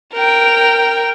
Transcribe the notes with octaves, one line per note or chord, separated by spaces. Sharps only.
A#4 G5